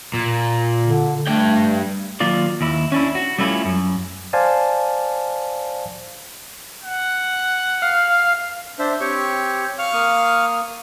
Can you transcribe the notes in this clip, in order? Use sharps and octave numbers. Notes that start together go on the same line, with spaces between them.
A#2
D3
G2 A3 G5
D#3 F#3 A#3 F4 D5
D#2 E4
C#4 D4 E4
F#4
G3 A3 C#4 E4 F4
F#2
C5 D5 F5 G#5 A5
F#5
F5
D4 C5 E5
C4 G4 C#5 C#6
F5 C#6 F6
A#3 D#6